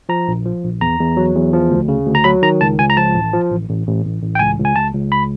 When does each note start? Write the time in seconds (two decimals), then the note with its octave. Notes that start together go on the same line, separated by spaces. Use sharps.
0.09 F3 A#5
0.28 A#1
0.46 F3
0.63 A#1
0.81 E2 A#5
0.99 E2
1.17 F#3
1.35 E2
1.53 F3
1.71 D2
1.88 C#3
2.07 D2
2.15 A#5
2.24 F#3 B5
2.42 D#3 A#5
2.61 C#2 A5
2.78 C#2 G#5
2.90 A#5
2.97 F3 A5
3.14 A1
3.33 F3
3.51 A1
3.68 A1
3.86 A1
4.04 A1
4.22 A1
4.35 G5
4.39 C#2 G#5
4.58 C#2
4.65 G#5
4.76 C#2 A5
4.94 C#2
5.12 B5